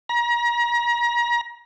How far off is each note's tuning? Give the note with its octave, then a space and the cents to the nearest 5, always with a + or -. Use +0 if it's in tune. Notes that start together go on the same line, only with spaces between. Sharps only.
A#5 +35